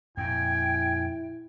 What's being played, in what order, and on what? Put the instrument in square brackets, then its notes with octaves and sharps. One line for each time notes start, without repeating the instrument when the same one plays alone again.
[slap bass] F2 A#2 [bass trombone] E4 [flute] G5 [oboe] G#5